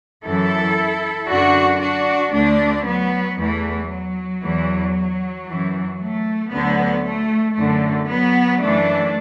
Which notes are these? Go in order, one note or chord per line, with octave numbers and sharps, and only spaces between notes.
F#2 E3 E4 A4
F#2 D3 D4 F#4
D4 F#4
D2 D3 A3 D4
F#3 B3
E2 E3 A3
F#3
E2 E3
F#2 E3
A3
D2 D3 F#3 B3
A3
F#2 D3 A3
F#3 B3
F#2 E3 A3 D4